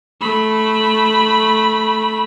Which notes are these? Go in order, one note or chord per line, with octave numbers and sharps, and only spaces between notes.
A3 B5